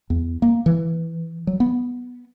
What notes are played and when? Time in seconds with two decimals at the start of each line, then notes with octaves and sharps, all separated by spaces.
0.10 E2
0.42 A#3
0.66 E3
1.47 F#3
1.60 B3